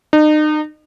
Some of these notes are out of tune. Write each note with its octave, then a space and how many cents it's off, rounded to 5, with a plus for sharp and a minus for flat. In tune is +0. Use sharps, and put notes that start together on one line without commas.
D#4 -35